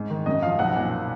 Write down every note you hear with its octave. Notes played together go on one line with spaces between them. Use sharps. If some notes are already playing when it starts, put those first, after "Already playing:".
Already playing: G#2
D#3
F#2 D#5
F3 F5
B1 F#5
A#2